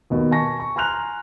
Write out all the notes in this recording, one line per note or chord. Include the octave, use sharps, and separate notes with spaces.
D#2 B2
G#5 A5 C#6 A#6
C#6
G#5 A#5 C6 F6 F#6 F7